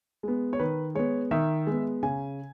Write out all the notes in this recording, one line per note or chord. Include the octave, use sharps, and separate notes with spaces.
G#3 B3
C#5
D#3 B4
G#3 B3 C#5
D#3 E5
G#3 B3
C#3 G#5